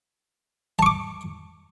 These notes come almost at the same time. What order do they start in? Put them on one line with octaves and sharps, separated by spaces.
A5 C#6 D6